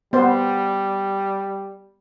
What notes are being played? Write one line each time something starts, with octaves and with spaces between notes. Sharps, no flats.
G3 B3 C5